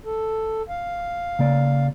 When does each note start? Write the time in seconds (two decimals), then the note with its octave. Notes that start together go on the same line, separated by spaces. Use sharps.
0.05 A4
0.69 F5
1.39 C#3 A#3 D5